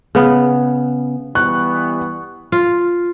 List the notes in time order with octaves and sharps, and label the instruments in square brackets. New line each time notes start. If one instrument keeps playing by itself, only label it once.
[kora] C#3 B3
[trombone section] E3 G3 B3 [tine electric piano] C#6 [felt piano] F#6
[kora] F4